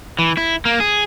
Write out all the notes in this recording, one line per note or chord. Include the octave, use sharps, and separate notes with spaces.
E3
E4
A#3
G#4